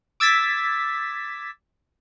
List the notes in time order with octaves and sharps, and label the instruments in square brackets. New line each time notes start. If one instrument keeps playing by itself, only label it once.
[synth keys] D6 E6 G#6 A6 B6